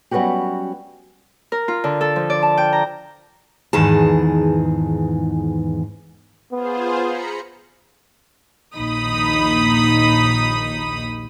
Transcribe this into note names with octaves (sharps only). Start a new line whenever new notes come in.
F#3 G3 B3 C#4 F#4 G4
A#4
F4
D3
A4
F3
D5
A5
G5
A#5
E2 G#2 D#3 E3 G#4 A5
B3 F4 G#4 C5
A#5 B5 C#7
A#1 D#2 A#2 D#4 B5 D#6